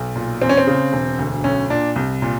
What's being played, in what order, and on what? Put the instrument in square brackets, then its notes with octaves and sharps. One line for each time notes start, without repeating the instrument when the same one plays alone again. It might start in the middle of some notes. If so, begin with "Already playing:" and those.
Already playing: [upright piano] B1
A#2
E2 C4
C#4
C4
C#3
E1
D2
B1 C#4
A#2 D4
C2
A#2